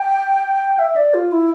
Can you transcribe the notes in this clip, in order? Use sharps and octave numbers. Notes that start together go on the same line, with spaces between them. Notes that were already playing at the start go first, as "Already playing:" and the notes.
Already playing: G5
E5
D5
F4
E4